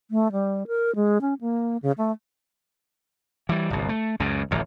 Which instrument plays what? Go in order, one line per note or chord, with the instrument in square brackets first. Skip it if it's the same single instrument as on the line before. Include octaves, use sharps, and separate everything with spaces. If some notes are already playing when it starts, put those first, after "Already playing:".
[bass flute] A3
G3
A#4
G#3
C#4
A#3
C#3
A3
[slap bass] E3 G3
G1 C2
A3
C#2 F#2 C#3
D1 A1 E2